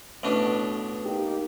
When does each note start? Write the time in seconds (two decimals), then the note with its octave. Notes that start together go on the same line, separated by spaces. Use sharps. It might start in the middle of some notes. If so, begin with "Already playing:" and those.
0.23 A1 B2 D4
1.05 A#3 D#4 G4